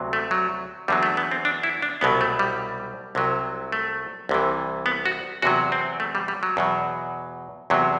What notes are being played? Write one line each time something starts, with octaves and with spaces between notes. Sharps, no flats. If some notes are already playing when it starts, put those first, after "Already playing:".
Already playing: D2 C3 F#3
A3
F#3
E2 D3 F#3 G3
A3
B3
C4
D4
E4
D4
C2 B2 F#3 B3
A3
G3
C2 C3 F#3
A3
C2 C3 E3
B3
F#4
E2 C3 F#3 F#4
C4
A3
G3
G3
F#3
E2 B2 F#3
E2 C3 F#3